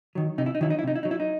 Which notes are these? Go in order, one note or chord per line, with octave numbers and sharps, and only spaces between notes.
D#3 F#3
C3 D#4
E4
D#4
D#3 F#3 E4
D#4
E4
C3 D#4
E4
F#3 D#4
E4
D#4